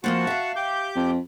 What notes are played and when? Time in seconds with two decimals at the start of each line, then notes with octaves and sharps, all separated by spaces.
0.04 F3 A#3 C4 F#4 F#5 A5
0.27 E5 F5
0.56 G4 D6 G6
0.96 F2